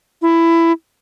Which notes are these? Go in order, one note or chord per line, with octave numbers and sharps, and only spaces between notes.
E4